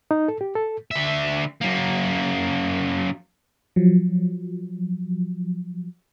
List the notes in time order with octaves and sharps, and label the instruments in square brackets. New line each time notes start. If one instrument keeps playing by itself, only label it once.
[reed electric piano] D#4
A4
G4
A4
[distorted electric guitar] D3 E5
F#2 A#3
[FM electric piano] F3 F#3